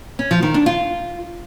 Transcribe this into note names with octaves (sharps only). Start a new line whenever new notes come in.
C#4
F3
D#3
D4
F4